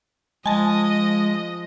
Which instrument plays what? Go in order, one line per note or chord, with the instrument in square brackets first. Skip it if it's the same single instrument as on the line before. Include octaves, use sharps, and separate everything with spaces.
[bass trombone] F3 [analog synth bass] G#3 [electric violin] D#5 [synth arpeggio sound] G#5 A5